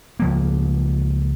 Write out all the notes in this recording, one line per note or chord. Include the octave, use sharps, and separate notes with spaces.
C#2 F3 A#3